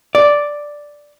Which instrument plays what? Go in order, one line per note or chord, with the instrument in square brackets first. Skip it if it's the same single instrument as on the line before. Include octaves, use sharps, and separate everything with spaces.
[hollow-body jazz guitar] D5